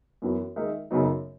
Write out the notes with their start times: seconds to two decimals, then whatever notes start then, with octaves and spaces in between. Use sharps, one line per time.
0.22 F#2 E3 B3 F#4
0.56 D#3 G#3 D#4 A#4 E5
0.91 F#2 C#3 F#3 B3 D#4